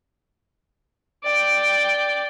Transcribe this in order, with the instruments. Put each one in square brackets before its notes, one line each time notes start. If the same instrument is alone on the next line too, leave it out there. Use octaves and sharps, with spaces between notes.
[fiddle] D5 G5